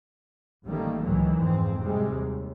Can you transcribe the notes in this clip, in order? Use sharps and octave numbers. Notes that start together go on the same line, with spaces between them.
A1 D#3 G3 A3 A#3
C#2 A#2 D#3 E3 F#3
F2 G#2 C4
G#2 C3 G3 G#3
D#2